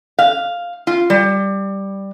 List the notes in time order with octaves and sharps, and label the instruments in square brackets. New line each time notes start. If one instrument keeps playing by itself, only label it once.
[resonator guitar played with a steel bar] F5
F4
G3